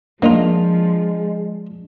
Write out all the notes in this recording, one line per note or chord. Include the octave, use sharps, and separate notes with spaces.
F3 G#3 A#3 D4 D#4 F4